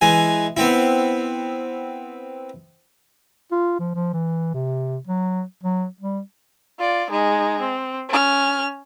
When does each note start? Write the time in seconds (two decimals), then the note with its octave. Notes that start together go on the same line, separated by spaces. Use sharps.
0.01 E3 G#3 G#5
0.57 B3 C4 E4
3.52 F4
3.80 F3
3.95 F3
4.14 E3
4.54 C3
5.07 F#3
5.63 F#3
6.01 G3
6.78 F4 D5
7.10 G#3 D#4
7.60 C4
8.09 C#4 F6